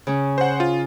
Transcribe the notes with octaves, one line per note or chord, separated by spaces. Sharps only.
C#3 C#4
C5 F#5
F4